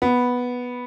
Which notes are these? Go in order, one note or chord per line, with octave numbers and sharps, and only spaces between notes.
B3